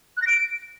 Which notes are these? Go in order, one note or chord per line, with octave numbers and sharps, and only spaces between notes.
F#6
A#6
D7